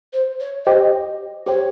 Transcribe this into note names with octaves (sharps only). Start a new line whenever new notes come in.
C5
C#5
G4 C5 D#5 G5
G4 C5 C#5 G5